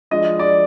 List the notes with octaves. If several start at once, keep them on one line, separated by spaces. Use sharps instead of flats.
F3 G#3 D4 F4 D#5
D5